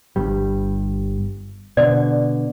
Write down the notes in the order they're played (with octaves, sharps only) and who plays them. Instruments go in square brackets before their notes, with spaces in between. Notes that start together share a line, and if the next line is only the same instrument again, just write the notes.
[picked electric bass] G1 G2 G3
[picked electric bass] B2 D3 [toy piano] D5